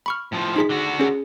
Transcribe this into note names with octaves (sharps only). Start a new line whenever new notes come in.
B5 C#6 F6
A2 F3
D#4 G#4 B6
D3 F#4
C#4 G#4